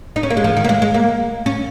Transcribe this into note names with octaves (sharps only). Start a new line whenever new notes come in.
D#4
C#4
A#3
G#3
F3
D#3
A#3
G#3
G#3
A#3
C#4